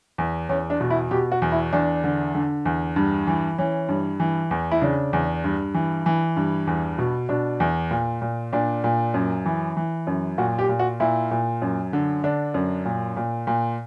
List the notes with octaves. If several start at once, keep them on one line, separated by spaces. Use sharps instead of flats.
E2
E2 C#4
D4
B2
E4
B2 G4
F#4
E2
E4
E2 D4
D3
D3
E2
G2
E3
E3 C#4
G2
E3
E2
E4
C#3 D4
E2
G2
E3
E3
G2
E2
B2
B2 D4
E2
A#2
A#2
A#2 D4
A#2
F#2
E3
E3
F#2
A#2 F#4
G4
A#2
F#4
A#2 E4
A#2
F#2
D3
D3 D4
F#2
A#2
A#2
A#2